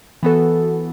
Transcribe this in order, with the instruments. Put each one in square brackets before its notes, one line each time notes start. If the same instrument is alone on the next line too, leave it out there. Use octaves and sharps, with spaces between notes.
[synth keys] E3 B3 F#4 A4